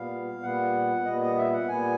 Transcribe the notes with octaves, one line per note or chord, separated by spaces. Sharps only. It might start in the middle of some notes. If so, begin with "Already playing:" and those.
Already playing: A#2 G3 B3 F5
A#2 G3 B3 F#5
A#2 G3 B3 D#5
D#5
E5
F#5
A#2 G3 B3 G#5